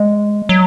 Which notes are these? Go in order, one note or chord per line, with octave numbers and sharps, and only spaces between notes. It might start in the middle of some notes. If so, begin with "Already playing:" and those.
Already playing: G#3
F#3